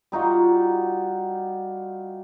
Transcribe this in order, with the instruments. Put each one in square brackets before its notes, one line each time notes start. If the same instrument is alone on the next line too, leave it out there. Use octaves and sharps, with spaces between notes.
[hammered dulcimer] G3 D#4 F4 F#4